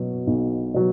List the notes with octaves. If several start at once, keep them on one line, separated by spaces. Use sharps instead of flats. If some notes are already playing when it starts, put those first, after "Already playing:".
Already playing: B2 F#3
B1
B2 F#3